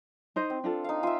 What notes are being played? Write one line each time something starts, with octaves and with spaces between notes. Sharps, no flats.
D#4 C5 D#5
C4
D4 F4 A4
D#4 F5
F4 E5 G#5